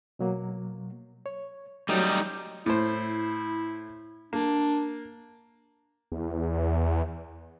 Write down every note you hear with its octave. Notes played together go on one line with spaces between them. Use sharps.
B2 F#3 A#3
C#5
F#3 G3 A3 D#4
A2 E4 C5
A#3 D4
E2